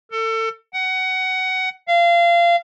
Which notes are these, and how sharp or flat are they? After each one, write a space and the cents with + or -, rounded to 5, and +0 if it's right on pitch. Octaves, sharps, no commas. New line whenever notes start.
A4 +30
F#5 +20
F5 -25